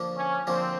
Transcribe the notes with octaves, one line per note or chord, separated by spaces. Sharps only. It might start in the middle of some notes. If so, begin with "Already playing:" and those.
Already playing: D3 F3 A#3
C#4
D3 F3 A#3 C4